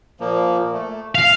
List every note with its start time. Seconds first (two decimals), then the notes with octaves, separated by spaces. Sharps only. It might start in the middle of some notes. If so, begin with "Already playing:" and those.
0.20 A#2 F3 A#3
0.73 A3
1.15 F5 F6